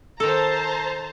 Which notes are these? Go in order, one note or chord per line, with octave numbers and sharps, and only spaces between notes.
D#3 A4 C5 A5 A#5